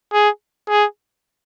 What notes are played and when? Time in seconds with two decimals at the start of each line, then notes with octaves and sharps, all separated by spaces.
0.13 G#4
0.68 G#4